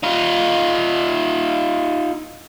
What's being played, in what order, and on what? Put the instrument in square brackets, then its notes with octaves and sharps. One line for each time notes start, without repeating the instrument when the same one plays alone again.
[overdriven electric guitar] D#4 F4